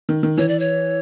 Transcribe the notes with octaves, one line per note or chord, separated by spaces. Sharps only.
D#3
D#3
E3 C#5
D5
C#5